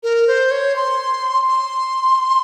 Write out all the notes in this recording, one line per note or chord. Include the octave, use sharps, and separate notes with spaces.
A#4
C5
C#5
C6
C6